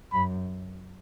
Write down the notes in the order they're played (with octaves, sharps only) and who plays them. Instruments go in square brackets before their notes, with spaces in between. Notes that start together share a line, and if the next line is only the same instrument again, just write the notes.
[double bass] F#2 [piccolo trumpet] B5